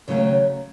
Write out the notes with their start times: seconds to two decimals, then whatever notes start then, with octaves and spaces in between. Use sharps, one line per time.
0.08 D#2 C#3 F#3 A3 C#4